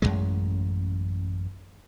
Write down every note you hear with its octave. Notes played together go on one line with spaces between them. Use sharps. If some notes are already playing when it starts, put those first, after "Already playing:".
A1 F#2 A2 G#3